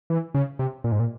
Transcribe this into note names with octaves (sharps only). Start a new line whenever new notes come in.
E3
C#3
C3
A#2
G#2
A#2